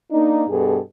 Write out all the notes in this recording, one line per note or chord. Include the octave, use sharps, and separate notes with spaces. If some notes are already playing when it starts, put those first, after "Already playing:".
A#3 D4 D#4
G2 B2 G#4 A4